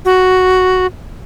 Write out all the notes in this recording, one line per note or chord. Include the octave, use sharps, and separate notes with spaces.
F#4